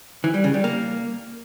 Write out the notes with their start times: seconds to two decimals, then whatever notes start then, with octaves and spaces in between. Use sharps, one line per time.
0.24 E3
0.34 G3
0.44 C#3
0.54 G3
0.64 A#3